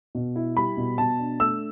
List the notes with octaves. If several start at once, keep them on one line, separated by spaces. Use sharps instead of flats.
B2
E4
G3 B5
B2
B2 A5
D4
A3 E6